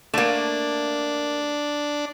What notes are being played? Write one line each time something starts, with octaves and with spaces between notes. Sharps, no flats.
A3 A#3 D4